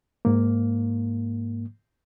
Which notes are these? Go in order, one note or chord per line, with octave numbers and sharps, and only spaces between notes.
G#2 A#3